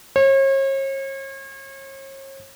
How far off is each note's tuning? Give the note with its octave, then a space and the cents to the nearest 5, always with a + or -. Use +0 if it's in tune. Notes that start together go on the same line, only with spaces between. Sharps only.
C#5 -40